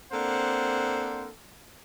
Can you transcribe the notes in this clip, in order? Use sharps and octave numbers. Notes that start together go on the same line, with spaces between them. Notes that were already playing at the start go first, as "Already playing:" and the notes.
A#3 C4 D4 A4 C5 F#5